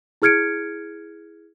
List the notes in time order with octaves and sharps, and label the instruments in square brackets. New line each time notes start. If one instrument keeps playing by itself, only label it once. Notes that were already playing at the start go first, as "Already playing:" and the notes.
[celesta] E4 G#4 F6 G#6 C#7 D7